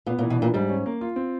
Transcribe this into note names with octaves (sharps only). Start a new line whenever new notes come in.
A#2 B3
A#2
E3
B2
A#2 D4
G#2 G3
C#4
A#3
F4
C4